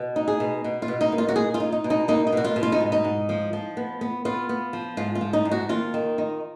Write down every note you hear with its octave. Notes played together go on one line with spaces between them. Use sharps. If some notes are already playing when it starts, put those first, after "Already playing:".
Already playing: B2
D#4
G#4
B2
B2
F4
B2
D#4
A#3
F4
F#4
D#4 G#4
F4
D#4
D#4
B2
D#4
A#3 D#4
D#4
B2 F#4
F4
B2
F4
D#4
G#2
D#4
G#2
F3
F3
B3
B3
B3 F4
B3
F3
G#2 F4
F4
F3
D#4
G#2
F#4
D#2 F4
D#3
D#4